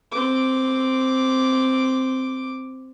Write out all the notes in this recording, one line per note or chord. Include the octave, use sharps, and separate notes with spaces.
C4 D6